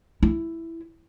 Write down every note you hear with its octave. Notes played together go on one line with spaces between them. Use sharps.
E4